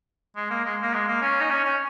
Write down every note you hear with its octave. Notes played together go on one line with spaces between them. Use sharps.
G#3
A#3
G#3
A#3
G#3
A#3
C#4
D#4
C#4
C#4